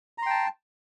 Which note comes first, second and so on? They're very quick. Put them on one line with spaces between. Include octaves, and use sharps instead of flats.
A#5 C6 G5 A5